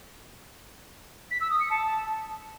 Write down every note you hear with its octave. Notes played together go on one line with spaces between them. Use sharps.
B6
E6
D#6
C#7
A5